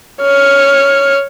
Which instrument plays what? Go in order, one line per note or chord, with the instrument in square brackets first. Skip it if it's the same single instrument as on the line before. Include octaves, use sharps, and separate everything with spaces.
[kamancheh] C#5 F6